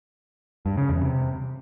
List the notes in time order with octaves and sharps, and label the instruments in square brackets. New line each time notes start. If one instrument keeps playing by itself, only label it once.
[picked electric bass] G2
C#3
E2
C3